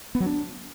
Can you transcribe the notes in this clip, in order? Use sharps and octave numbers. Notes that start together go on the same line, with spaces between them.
B3
F#3
D4